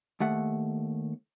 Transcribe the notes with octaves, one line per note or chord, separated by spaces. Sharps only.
D#2 A3 F#5